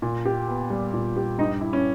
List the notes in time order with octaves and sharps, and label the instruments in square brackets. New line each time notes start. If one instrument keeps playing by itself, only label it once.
[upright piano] A#2
G4
B3
G3
A#2
G4
[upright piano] G2 [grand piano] D#4
[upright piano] E4
[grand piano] C#4